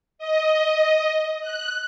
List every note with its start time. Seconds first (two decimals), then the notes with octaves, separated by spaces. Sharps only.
0.18 D#5
1.41 F#6